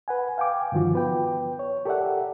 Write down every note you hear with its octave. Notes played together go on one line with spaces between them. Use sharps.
B4 F#5 G#5
F5 G5 G#5 D6
G2 D3 D#3 F3 F4 F#4
B3 B4 G5
C#5
G4 A4 A#4 D5 E5 F#5